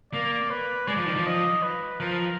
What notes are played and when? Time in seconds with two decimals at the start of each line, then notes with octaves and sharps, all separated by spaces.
0.13 A#3 D5
0.51 B4
0.88 G#3 D5
0.97 F3
1.06 D#3
1.16 F3
1.26 D#5
1.63 B4
2.00 F3 A#4